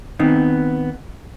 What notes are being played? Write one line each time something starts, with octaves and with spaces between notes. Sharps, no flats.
D#3 B3 C4 D#4